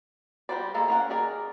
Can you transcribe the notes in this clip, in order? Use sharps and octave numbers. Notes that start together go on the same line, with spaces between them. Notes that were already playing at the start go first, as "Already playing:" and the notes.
G3 F#4 B4 C5 D5
F3 G#3 A#3 G#4 A4
A#3 C#4 F#5
D#3 G#4 A#4 D5